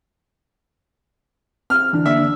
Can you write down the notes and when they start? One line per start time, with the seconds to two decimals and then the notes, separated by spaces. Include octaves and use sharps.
1.70 C4 F6
1.93 D3 E3 D4
2.06 D3 A#3 D5 E5